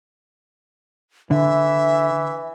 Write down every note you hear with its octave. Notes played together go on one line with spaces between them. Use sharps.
D3 E3 E5